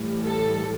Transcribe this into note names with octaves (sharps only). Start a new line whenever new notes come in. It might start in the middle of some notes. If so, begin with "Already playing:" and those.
Already playing: A2 E3 G3
A4